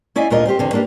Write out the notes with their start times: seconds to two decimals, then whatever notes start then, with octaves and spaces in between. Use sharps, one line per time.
0.16 C#4 E4 D5 D#5 F5 G#5
0.30 D2 A#2 D3 F4 A#4 D#5
0.45 C4 F4 G4 C5
0.59 E2 D3 C4
0.73 A#3 D4 E4 G4 B4